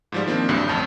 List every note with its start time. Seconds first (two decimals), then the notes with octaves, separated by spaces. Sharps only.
0.12 G#2 F3 G3
0.27 D#3 F3 A#3 C4 D4
0.49 C2 G2 D3 F#3
0.68 A1 F2 A5 D#6 G6